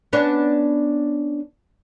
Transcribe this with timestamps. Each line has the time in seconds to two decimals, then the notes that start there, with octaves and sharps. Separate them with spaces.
0.13 B3 C#4 D4